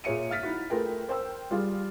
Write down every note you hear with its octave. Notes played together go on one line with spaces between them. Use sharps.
A#2 G#4 C#5 E5 C#7 D#7
E5 F5 F6 A6 B6
D#4 E4 F#4
A3 F4 G#4 A#4 B4 G5
A#4 C5 G5 E6
G3 F4 G#4 F5